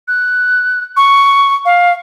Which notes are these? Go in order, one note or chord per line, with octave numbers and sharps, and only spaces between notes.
F#6
C#6
F5